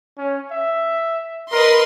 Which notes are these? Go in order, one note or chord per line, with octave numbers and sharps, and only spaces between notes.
C#4
E5
A#4 B4 D#5 C6